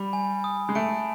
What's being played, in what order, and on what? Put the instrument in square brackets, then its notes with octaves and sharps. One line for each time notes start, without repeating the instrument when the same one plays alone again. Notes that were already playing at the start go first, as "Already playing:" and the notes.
Already playing: [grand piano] G3 [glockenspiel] B5
[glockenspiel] G#5
D#6
[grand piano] G#3
[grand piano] A3 [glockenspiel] D7